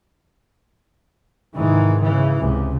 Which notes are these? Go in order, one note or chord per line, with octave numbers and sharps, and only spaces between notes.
G#2 C3 D#3 E3
C#3 E3
C#2 C3